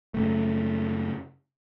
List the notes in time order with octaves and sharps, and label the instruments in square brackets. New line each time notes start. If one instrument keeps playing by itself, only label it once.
[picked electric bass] F#2 C#3 A3